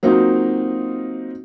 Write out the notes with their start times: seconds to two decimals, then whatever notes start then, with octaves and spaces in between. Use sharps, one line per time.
0.03 F#3 A#3 C4 D#4 F4